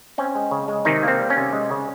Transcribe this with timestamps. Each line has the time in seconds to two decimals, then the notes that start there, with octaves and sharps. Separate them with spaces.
0.18 C4 C#4
0.35 G#3
0.51 C#3
0.68 G#3
0.85 C3 D#3 D#4
1.03 A#3 C4
1.19 G3
1.30 C#4
1.37 C3
1.53 G#3
1.71 C#3